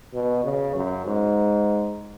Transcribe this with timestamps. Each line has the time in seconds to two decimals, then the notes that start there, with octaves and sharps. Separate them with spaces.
0.13 B2
0.44 C#3
0.75 F#2
1.07 G#2